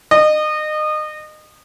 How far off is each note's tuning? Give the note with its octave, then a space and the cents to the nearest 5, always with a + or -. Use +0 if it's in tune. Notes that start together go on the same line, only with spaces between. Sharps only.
D#5 -30